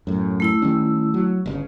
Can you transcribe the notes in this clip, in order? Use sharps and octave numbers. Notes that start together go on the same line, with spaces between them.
F#2 A2
A3 E4 E6
D#3 G3 C#4
F#3
G1 A#2 C#3